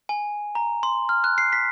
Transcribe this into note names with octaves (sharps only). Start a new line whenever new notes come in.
G#5
A#5
C6
F6
F#6
C7
B6